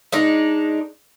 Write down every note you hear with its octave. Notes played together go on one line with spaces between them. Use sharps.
G#3 D4 D#4